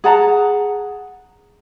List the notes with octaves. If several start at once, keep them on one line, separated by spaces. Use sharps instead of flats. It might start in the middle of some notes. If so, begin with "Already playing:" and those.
G#4 F#5 A5 A#5